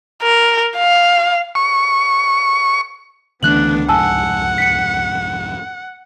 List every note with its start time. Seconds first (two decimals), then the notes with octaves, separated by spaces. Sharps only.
0.22 A#4
0.77 F5
1.55 C#6
3.43 C#2 D3 E3 A3 B3 D4 F#6 F#7
3.89 C2 F2 G#2 F#5 G#5 A5 E6
4.58 B6 C#7